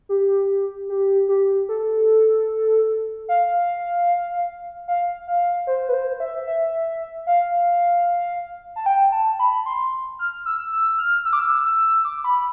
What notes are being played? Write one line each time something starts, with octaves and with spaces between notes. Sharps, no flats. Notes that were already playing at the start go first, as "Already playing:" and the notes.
G4
G4
G4
A4
F5
F5
F5
C5
B4
C5
E5
E5
F5
A5
G5
A5
B5
C6
F6
E6
E6
F6
E6
D6
E6
E6
D6
B5